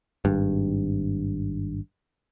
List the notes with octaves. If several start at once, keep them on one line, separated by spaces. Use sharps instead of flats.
G#1 G2